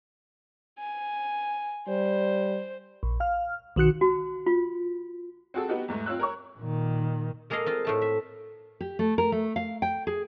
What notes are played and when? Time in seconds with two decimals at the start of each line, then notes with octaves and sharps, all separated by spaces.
0.79 G#5
1.88 G3 C5
3.03 A#1
3.20 F5 F6
3.76 B1 D#3 F#4 F#6 C#7
4.01 F#4
4.46 F4
5.54 C4 F#4 G#4 A4
5.69 B3 D#4 F#4 G4
5.88 E2 G#2 A3
6.06 C4 F4 C#5 E6 F#6
6.19 A#4 C#5 C#6
6.59 A#2 D#3
7.50 G#3 A#3 G#4 A4 D#5 F5
7.66 C4 F4 D#5
7.85 A2 A3 A5
8.02 E5
8.81 G4
8.99 A3
9.18 A#4
9.32 A3
9.56 F5
9.82 G5
10.07 G#4